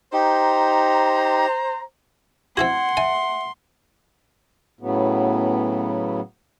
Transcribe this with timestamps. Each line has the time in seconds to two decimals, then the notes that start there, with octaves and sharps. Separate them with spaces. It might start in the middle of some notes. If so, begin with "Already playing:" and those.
0.13 D#4 G4 C5 A#5
2.57 C4 E4 F#4 F#5 C6 G#6
2.97 E5 G#5
4.81 A2 C#3 F#3 B3